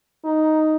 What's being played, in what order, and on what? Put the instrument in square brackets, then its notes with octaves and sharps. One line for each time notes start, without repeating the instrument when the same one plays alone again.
[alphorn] D#4